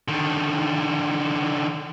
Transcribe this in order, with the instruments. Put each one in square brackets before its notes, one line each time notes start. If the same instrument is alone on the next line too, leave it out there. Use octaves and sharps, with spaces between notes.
[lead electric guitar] D3 D#3